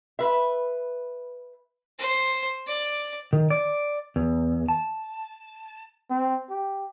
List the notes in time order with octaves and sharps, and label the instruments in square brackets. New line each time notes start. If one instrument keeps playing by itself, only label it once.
[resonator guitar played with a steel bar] B4 E5
[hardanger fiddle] C5
D5
[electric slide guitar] D#3
D5
E2
A5
[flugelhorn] C4
G4